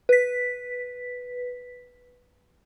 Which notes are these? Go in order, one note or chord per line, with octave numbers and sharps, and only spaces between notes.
B4 B6